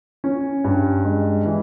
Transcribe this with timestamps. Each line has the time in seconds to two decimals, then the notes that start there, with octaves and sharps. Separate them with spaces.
0.24 C#4
0.64 G2
1.05 G#3
1.46 E3